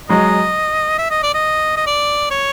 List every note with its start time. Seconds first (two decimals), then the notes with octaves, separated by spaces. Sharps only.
0.09 F#3 G#3 D#5
0.98 E5
1.11 D#5
1.23 D5
1.34 D#5
1.77 D#5
1.86 D5
2.30 C#5